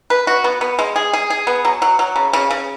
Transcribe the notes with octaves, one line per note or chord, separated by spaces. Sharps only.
B4
F#4
B3
B3
G#3
G#4
G#4
G#4
B3
F#3
F#3
F#3
C#3
C#3
C#3